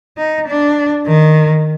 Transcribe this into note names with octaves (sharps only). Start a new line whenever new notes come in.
D#4
D4
D#3